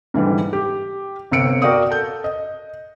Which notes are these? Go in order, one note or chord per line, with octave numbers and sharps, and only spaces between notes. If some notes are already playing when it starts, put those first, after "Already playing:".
G#2 D3 E3 G3
G4
G1 C3 E6 C#7 D7
F#4 A#4 D5 F5 G5 D#6
A4 G6
D#5